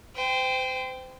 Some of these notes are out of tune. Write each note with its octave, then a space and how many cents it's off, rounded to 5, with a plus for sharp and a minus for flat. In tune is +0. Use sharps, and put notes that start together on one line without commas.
C5 -30 G5 +0